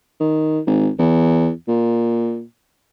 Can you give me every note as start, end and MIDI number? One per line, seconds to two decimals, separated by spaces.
0.20 0.60 51
0.67 0.89 32
0.99 1.50 40
1.68 2.42 46